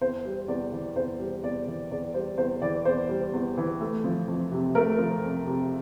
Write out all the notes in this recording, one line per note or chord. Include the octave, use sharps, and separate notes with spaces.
E2 C5
G3
E2 D5
E3
E2 C5
G3
E2 D5
E3
E2 D5
G3 C5
E2 C5
E3 D5
E2 C5
G3
E2
E3
A3
F3
F2
C3
A3 A#4
F3
F2
C3